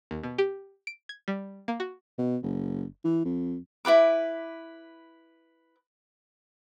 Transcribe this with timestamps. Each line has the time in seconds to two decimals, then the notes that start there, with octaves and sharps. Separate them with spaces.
0.11 D#2
0.23 B2
0.38 G4
0.87 D7
1.09 G#6
1.28 G3
1.68 A#3
1.80 F#4
2.18 B2
2.43 F#1
3.05 E3
3.25 F2
3.85 E4 F4 B4 D6